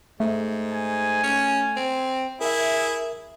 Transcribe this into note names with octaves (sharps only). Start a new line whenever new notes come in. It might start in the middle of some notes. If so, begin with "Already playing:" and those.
G#2 A3
G#5
C#4
C4
E4 G#4 A#4 E5